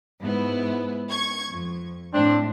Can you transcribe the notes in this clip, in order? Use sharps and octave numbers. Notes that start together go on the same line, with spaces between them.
G#2 B3 E4
C#6 G#6
F2
A2 C4 D4